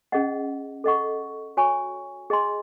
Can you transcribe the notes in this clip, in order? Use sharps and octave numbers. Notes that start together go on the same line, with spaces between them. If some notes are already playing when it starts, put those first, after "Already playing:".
C#4 G#4 D#5 F#5
A4 D#5 F#5 C#6
F#4 C#5 G#5 C#6
G#4 D#5 G#5 C6